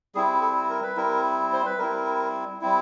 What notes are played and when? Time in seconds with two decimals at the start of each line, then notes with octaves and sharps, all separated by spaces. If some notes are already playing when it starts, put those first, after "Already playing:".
0.15 G3 C4 E4 G#4
0.41 A4
0.70 A#4
0.83 B4
0.96 G3 C4 E4 A#4
1.53 C5
1.66 B4
1.78 G3 C4 E4 A#4
2.61 G3 C4 E4